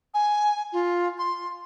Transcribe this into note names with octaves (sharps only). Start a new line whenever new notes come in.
G#5
F4
C6